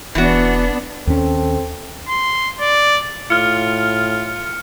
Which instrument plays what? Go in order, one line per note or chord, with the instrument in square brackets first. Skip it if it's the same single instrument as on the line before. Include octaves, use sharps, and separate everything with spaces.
[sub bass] E1 [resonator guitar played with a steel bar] E3 F#4 [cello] B3 D4
[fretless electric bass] D#2 C#4 [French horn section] C4 A4
[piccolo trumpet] C6
D5
[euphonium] A2 [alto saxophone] F4 [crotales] F6 C#7